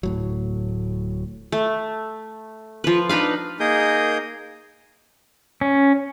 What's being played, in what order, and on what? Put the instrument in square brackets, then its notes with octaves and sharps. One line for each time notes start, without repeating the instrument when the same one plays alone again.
[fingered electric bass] D1 A2 F#3
[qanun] A3
F3 B4
D4 D#4 B4 F5
[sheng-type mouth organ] A#3 D#4 G#4 A#4 D#6 G6
[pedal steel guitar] C#4